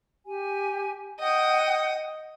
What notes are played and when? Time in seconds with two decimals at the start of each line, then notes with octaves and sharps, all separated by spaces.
0.25 G4 G#5
1.20 D#5 F#5 G5 D#6 G6